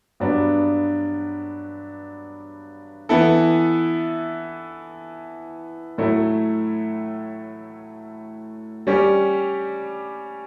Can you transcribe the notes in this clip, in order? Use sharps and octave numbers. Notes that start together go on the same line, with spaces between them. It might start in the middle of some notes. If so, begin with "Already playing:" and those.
G2 F#3 B3 D4
E3 B3 E4 A4
A2 F#3 A3 E4
G3 C#4 G4